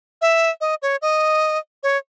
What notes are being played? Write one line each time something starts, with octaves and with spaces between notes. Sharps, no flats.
E5
D#5
C#5
D#5
C#5